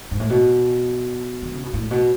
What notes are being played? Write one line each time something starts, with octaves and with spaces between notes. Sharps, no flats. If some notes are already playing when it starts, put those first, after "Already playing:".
G#2
A2
B2
D#3
C#3
B2
A2
B2